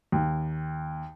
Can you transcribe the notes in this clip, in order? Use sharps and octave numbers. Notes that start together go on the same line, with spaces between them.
D#2